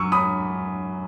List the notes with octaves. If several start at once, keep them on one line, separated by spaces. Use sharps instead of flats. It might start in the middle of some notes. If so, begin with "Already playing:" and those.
Already playing: F#2 C#6 E6
B5 D#6